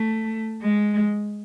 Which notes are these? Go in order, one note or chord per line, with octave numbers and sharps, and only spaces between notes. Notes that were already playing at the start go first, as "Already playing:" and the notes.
Already playing: A3
G#3